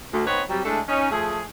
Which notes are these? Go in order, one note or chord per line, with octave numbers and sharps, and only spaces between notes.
D2
B3 C4 D#4 B4 C#5
C3 F#3 G3
G#3 A3 D4 E4 A4
C#4 D#4
F3 A3 G#4